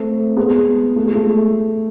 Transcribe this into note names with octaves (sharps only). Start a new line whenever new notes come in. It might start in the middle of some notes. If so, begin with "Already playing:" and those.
Already playing: A3 C4
G#3 B3
A3
G#3
A3